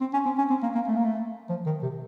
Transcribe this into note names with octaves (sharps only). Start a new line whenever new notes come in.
C4
C#4
C4
C#4
C4
A#3
A#3
A3
A#3
A3
F3
D#3
C3